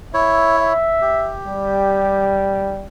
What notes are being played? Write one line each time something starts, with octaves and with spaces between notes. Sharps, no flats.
E4 C#5 E5
E5
G4
G3